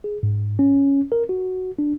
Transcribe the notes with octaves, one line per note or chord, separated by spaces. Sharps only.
G#4
G#2
C#4
A#4
F#4
D4